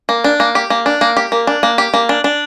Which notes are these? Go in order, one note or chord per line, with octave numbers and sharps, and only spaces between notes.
A#3
D4
A#3
G4
A#3
D4
A#3
G4
A#3
D4
A#3
G4
A#3
D4
D4